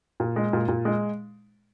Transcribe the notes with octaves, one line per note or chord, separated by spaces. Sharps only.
A#2
G#3
A#2
A#2
G#3